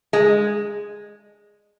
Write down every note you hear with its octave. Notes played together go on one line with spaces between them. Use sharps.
G#3